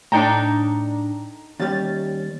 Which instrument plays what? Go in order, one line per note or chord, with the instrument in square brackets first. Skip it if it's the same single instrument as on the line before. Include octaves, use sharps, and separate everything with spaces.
[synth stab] A2 D4 [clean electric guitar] D#4 A4 G5 [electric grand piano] A5 A#5
[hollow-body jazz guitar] D#2 G3 [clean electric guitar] C#4 [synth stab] A6